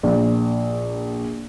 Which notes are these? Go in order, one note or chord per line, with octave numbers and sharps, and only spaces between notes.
A#1